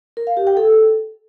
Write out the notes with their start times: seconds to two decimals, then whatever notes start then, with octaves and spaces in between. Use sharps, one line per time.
0.17 A#4
0.27 F5
0.37 G4
0.47 G5
0.57 A4